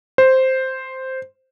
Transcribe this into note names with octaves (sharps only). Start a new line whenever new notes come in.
C5